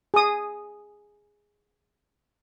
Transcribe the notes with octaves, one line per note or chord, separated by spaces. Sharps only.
G#4 D#6